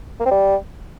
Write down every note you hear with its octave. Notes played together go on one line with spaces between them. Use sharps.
A#3
C4
G3